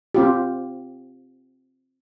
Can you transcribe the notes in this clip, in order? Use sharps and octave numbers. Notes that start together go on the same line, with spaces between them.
C4 F4 G4